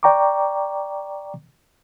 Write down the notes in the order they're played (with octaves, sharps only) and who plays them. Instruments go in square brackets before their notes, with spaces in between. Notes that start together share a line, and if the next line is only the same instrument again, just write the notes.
[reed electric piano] D5 G5 A#5 C#6 D6